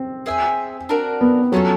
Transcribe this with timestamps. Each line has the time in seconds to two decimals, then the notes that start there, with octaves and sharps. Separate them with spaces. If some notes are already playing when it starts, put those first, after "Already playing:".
Already playing: C4
0.26 G#4 C5 E5 G#5
0.89 D4 F#4 A#4 D5
1.21 B3
1.52 F#3 A3 C#4 F4 A4